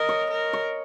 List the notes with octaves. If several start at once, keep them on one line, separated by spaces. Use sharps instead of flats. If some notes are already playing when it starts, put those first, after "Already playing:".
Already playing: A#4 D#5
C#5
A#4
C#5